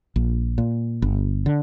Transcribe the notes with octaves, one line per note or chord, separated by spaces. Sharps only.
A#1
A#2
G1
D3